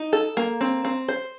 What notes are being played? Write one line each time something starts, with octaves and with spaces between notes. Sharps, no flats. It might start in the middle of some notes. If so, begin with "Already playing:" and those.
Already playing: D#4
A4
A#3
C4
C4
C5